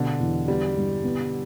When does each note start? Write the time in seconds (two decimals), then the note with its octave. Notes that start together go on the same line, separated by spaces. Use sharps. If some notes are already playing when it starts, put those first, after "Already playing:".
Already playing: B2 D3 G4
0.20 E2
0.47 G3 B3
0.76 G2
1.03 B3